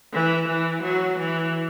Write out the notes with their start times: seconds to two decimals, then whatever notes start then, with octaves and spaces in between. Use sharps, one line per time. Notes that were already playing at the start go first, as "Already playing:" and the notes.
0.13 E3
0.48 E3
0.83 F#3
1.18 E3